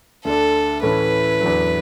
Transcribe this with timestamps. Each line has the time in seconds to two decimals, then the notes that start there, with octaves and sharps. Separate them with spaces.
0.25 D2 D3 A3 D4 A4
0.83 A2 E3 A3 C#4 E4 B4
1.41 E2 D3 F#3